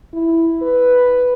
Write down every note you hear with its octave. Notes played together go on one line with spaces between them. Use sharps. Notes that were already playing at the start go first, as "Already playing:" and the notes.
E4
B4